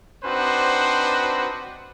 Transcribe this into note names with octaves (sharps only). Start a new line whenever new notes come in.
C4 D4 D#4 F#4 B4 C5